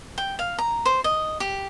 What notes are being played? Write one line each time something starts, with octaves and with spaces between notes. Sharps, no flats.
G5
F5
A#5
C5
D#5
G4